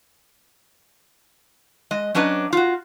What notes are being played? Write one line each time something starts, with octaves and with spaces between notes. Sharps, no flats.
G#3 D#5
F#3 C#4 D4 B4 D#5
F4 F#4